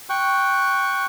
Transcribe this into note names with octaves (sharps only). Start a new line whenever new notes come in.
G5 C#6 F#6